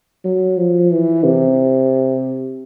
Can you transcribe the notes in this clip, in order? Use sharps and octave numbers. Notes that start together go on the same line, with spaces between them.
F#3
F3
E3
C3